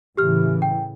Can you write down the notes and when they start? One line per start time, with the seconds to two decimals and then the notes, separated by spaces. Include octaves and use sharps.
0.17 A2 C#3 E3 G4 F6
0.62 G5